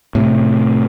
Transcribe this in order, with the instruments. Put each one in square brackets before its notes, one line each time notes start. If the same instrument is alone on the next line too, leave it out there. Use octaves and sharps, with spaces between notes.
[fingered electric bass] A2 C3